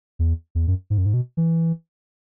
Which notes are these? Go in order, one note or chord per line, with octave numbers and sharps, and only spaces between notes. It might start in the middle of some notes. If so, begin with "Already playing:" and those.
E2
E2
F#2
G#2
F#2
G#2
B2
E3